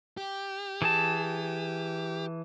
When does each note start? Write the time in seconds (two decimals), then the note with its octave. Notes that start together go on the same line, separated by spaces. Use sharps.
0.17 G4
0.82 E3 G#4 A5